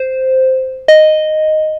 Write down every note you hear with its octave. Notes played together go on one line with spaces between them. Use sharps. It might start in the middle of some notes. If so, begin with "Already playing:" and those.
Already playing: C5
D#5